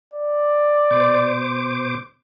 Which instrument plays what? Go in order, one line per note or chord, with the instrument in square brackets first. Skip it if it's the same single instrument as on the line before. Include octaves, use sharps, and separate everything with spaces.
[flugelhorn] D5
[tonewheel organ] B2 C5 D6